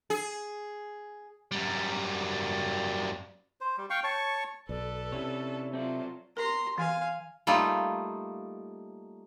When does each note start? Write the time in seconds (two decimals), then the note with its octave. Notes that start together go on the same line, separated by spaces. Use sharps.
0.10 G#4
1.52 F#2 G3
3.61 C5
3.78 G3
3.90 F5 G5 C#6
4.04 C#5 A5 C#6
4.69 B1 A4 B4 D5
5.12 C3 C#4 E4 C#5
5.73 F#3 C4 F4 A4 D5 E5
6.37 A#4 A#5 C6
6.78 E3 F5 G#5
7.47 G3 A3 A#3 D#4 F4